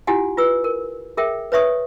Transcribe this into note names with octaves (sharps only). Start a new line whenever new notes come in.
E4 F4 G4 F#5 G#5
F4 B4 E6
A#4
G#4 A#4 E5 G5
B4 C#5 E5 C#6 D#6